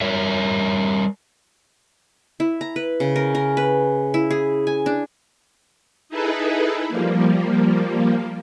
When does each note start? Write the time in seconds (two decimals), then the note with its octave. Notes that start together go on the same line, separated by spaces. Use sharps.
0.01 G3 A#4 C#5 E5
2.40 E4
2.61 A#5
2.76 B4
3.00 C#3
3.16 A#4
3.35 A#4
3.57 B4
4.14 E4
4.31 G#4
4.67 G#5
4.86 D4
6.09 D#4 E4 G#4 A4 B4
6.88 F3 G3 A#3